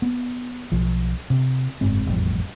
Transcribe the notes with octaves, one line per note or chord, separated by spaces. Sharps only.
B3
B1 F3
C3
F#1 G#2 C4
E1 A1 F2 G3